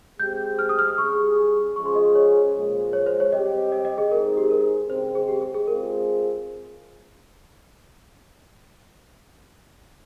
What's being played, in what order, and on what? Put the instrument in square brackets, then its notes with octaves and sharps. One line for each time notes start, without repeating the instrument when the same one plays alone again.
[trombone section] G#3 C4 G4 [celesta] G6
[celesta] F6
D#6
F6
D#6
[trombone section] G3 C#4 G#4 [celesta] C#6
[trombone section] F3 G#3 C#4 G#4 [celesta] C#6
[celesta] C6
D#5
C#5
[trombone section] A#2 F3 G#3
[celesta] C#5
C5
C#5
[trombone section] G3 C4 G4 [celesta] D#5
[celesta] D#5
D#5
G#4
[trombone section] G#3 C4 D#4 G#4 [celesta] A#4
[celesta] G4
A#4
[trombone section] C#3 G#3 C4 [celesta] C5
[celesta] C5
G#4
G4
G#4
G#4
[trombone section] G#3 C4 F4 G#4 [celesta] A#4